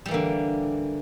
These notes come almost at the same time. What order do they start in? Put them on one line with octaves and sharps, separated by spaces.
G3 E3 A#3 D3